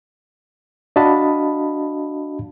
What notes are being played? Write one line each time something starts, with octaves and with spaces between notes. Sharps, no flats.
D4 F#4 D#5 F5 A5 B5